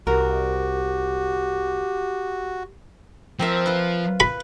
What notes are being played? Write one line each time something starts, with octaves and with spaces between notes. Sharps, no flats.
C2 F#4 G4 A#4
F3 C4 A#4 E5
F4 B4
B4 B5